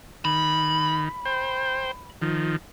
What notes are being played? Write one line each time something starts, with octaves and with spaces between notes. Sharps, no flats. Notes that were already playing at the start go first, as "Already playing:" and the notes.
D#3 B5
C5 G5
D#3 F3